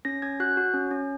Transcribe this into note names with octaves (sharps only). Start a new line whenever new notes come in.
C#4 A#6
C#4 G#6
F#4 F#6
F#4
C#4
C#4